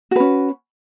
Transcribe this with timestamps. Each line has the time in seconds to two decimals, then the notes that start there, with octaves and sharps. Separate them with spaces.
0.11 F#4
0.16 B4
0.20 C#4